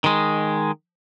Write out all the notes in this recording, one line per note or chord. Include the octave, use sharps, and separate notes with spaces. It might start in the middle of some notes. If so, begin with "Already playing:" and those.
D#3 G#3